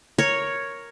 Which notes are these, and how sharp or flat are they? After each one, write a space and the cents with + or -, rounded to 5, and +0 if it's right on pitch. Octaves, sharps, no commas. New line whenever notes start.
A#4 +0 C#5 +0